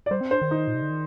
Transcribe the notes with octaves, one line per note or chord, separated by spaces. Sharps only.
D5
G3 C5
C4
D4 C5
D#3
D#4
A#2
C3
D3
D#3